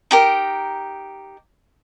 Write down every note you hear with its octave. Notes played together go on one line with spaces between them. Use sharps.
D#4 G4 A#4